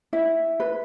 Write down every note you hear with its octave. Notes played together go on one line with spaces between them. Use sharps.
E4 E5
B4